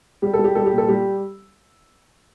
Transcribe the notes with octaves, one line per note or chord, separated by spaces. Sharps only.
G3 G4
A4
G3
G4
G3 A4
G4
A#2
A4
G3 G4